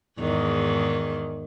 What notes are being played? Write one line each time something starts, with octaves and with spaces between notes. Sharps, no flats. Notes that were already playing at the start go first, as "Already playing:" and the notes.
E2 G#2 D#3